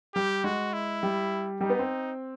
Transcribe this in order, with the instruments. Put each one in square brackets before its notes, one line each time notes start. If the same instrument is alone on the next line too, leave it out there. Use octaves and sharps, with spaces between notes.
[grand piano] G3 [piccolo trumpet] G4
[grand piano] G#3 [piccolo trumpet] F#4
[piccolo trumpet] E4
[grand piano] G3
[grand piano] G3 [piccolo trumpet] D#4
[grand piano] B3
C4